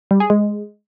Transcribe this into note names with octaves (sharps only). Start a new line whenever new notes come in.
G3
G#4
G#3